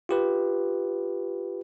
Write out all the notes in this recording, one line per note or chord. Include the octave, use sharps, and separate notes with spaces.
F4 G4 B4